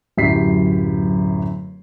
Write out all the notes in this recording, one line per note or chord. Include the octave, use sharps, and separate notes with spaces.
D1 F#2 E4 G4 B6 C7